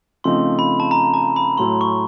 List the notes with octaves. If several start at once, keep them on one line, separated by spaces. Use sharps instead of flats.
C#3 F3 A3 C4 D#4 C6
B5
A5
A#5
A5
B5
A2 F#3 A3 C6
C#6